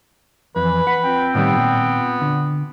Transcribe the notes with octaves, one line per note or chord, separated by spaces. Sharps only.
F2 E3 B4
F#5 B5
C4 F4 G5
A2 D#3 G3 B3
A#2
D3